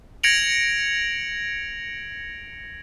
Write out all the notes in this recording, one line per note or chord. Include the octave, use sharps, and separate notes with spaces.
G#6 A#6 C#7 D7 F7 F#7